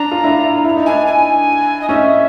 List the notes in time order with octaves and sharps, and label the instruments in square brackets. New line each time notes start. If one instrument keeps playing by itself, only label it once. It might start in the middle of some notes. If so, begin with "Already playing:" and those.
Already playing: [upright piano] D4 [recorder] A#5
[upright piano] F4
D4 E4
E4
D#4
[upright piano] D4 E4 [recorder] G#5
[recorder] G#5
D#5
[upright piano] C#4 D#4 [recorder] E5